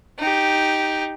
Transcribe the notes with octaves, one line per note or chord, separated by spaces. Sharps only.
D#4 G4